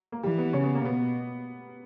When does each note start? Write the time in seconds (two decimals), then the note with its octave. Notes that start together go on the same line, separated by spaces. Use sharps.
0.12 A#3
0.23 E3 G3
0.38 B3
0.53 C#3 C#4
0.64 B3
0.75 A#3
0.84 B2 B3